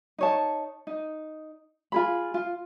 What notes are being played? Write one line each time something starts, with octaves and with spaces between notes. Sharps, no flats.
D#4 C#5 A5
D#4
F4 G#4 B5
F4